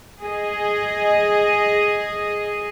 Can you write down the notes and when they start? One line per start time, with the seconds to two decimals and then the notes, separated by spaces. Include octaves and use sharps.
0.21 G#4 D#5